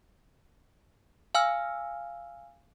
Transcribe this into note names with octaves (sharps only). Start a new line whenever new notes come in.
F5 G#5 E6 F6